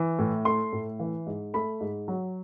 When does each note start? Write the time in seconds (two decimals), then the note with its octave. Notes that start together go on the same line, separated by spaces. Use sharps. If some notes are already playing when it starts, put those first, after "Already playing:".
Already playing: E3
0.19 A2
0.45 A3 C6
0.72 A2
1.00 E3
1.27 G#2
1.54 A3 B5
1.80 G#2
2.08 F#3